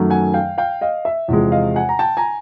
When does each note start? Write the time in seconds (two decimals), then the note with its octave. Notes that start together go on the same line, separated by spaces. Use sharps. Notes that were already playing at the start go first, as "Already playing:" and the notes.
Already playing: F#2 D#3 F#3 A3
0.10 F#5 G#5
0.34 F5 G5
0.58 F5 G5
0.81 D#5 F5
1.05 E5
1.28 E2 C3 F3 G#3
1.52 D#5 F5
1.76 F#5 G#5
1.89 A#5
1.99 G5 A5
2.17 G#5 A#5